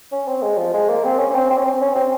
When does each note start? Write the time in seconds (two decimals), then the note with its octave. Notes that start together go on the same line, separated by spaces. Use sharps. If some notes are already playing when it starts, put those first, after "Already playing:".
0.12 C#4
0.28 C4
0.42 G#3
0.58 F3
0.74 G#3
0.89 A#3
1.05 C4
1.19 C#4
1.30 C#4
1.35 C4
1.51 C4
1.58 C#4
1.66 C4
1.81 C#4
1.96 C4